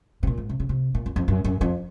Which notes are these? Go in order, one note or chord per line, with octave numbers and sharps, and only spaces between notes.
C3
A#2
G#2
C3
C#3
C3
A#2
F#2
F2
F#2
F#2
F2